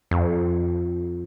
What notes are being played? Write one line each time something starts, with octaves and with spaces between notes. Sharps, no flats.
F2